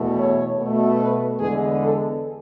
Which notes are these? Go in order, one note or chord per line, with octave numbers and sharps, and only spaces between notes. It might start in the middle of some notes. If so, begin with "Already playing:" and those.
Already playing: E2 B2 A3
C#5
B2 A3
B4
E2 D3 G#3 B3 G#4
A4